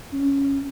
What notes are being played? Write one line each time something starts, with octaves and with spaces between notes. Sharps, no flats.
C#4